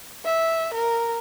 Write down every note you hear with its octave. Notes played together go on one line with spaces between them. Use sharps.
E5
A#4